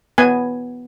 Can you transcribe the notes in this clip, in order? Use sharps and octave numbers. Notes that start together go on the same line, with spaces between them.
B3 G#5